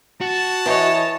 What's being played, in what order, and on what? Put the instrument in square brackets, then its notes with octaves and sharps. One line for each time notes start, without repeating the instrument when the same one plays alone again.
[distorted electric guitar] F#4 [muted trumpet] A5
[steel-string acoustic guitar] E3 [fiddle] C#5 D#5